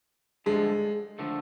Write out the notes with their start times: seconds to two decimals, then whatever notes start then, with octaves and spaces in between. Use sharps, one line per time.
0.46 G2 D3 F3 G#3 A3
1.19 D3 F3 A3